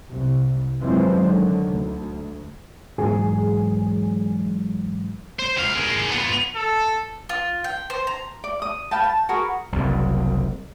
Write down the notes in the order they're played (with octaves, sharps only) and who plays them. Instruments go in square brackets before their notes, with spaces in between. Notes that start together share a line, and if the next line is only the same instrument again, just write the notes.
[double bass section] C2
F#2 E3 F3 G3 G#3 C4
D3 D#3 F#3
D2
[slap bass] G#2 E3 F#3 [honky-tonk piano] G#4
[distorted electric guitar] C5
C#2 F5
G#4 A#4
B3 F4
[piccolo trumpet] A4
[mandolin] F4
G5
C5
A#5
[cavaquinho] D5
D#6
B4 F5 G5 A5
A5
F#4 G#4 A#4 B4
[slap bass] F#1 C2